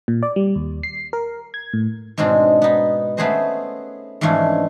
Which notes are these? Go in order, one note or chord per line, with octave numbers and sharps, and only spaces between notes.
A#2
D5
G3
D#2
C7
A#4
G#6
A2
G#2 B2 G#3 C4 D4
B3 D#4
A3 B3 C#4 G#4 C5 D#5
G#2 E3 F3 A3 C#4 D4